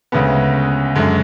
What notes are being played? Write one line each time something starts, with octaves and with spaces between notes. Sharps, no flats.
D2 C#3 G#3 B3
F#2 D3 G#3